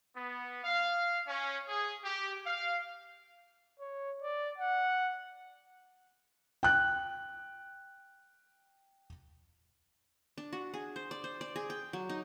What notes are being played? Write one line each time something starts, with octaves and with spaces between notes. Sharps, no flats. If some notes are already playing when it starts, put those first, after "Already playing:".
B3
F5
C#4
G#4
G4
F5
C#5
D5
F#5
G5 F#6
D4
F#4
G#4
C5
D5
C5
D5
G#4
G5
F#3
D#4